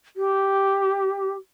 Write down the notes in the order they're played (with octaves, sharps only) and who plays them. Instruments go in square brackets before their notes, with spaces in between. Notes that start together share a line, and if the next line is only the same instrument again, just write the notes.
[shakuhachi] G4